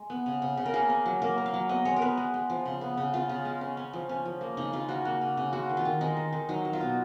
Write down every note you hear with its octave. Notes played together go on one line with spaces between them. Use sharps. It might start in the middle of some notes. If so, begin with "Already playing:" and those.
Already playing: G#3
B3
C#3
C#3
C#3
A#4
A#3 G#4
C#4
F#3
A#3 A#4
A#3
F5
F#3
B3 D#5
G#3 C#5
A#4
B3 B4
G#3
G#3
F3
C#3
B3
C#3
C#3 F4
C#3
G#3
C#4
C#4
F3
C#4
F3
A#3
C#3 D#4
C#3 F4
C#4 F#4
A#3 F#4
C#3
C#3
G#3 F#4
D#3
F4
D#3
G#3 D#4
D#3
D#3
F#3 D#4
F#3
F4
B2